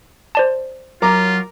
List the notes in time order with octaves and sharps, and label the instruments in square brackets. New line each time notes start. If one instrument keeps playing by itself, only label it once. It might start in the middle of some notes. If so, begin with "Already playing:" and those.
[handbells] C5 D5 A5
[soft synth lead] F#3 [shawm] F4 [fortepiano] A#4 A#5 D6